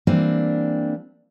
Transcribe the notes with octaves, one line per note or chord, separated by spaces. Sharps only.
E3 G3 A#3 C4 D4